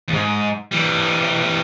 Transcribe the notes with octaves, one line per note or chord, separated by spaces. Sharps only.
D#2 G#2
E3 G3